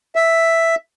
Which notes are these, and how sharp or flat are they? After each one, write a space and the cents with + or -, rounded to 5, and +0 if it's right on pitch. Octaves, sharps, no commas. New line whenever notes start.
E5 +0